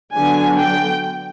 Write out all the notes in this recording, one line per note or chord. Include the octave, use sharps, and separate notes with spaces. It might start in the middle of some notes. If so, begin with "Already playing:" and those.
D3 F#3 B3 D4 G#5
G5